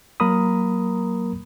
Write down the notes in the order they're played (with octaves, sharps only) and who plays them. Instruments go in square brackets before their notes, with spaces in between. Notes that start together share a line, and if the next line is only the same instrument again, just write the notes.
[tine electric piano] F#3 A#3 A#4 A#5 B5 D#6